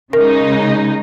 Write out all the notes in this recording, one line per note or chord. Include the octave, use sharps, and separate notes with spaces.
C#3 G#3 D#4 A#4